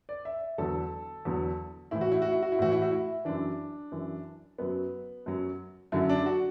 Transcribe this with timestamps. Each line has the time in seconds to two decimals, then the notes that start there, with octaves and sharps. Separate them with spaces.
0.09 D5
0.25 E5
0.58 E2 D3 F#3 A4
1.25 E2 D3 F#3
1.91 A2 E3 E4
2.01 F#4
2.12 E4
2.22 F#4
2.32 E4
2.42 F#4
2.52 E4
2.59 A2 E3 F#4
2.72 E4
2.82 F#4
2.91 E4
3.25 F#2 E3 D4
3.92 F#2 E3
4.58 F#2 F#3 B3
5.26 F#2 F#3
5.92 F#2 D3 F#3 E4
6.09 D4
6.26 F#4